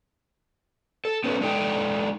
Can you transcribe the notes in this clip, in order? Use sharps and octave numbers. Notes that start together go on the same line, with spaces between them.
A4
B3 C#4 D#4 A4 B4 C#5
G#3 D4 D#4 A4 G5